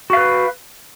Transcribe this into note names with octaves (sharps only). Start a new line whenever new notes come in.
F#4 B4 F5